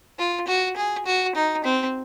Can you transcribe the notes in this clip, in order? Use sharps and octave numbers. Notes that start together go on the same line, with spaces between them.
F4
F#4
G#4
F#4
D#4
C4